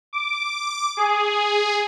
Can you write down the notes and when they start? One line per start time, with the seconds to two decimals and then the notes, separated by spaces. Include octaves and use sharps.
0.13 D6
0.97 G#4